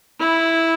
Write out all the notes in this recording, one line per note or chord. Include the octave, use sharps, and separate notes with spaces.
E4